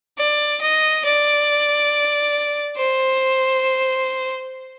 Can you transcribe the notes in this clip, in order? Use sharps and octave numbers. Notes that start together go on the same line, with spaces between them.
D5
D#5
D5
C5